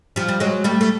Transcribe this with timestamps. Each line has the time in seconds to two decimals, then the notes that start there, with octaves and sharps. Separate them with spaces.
0.16 F3 G3
0.28 G3
0.40 F#3 G#3
0.64 G3 A3
0.81 A3